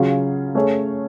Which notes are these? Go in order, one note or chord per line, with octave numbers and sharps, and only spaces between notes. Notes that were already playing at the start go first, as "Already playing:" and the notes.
Already playing: C#3 F#3 C#4 F4 G#4
A3 C#4 G#4 C#5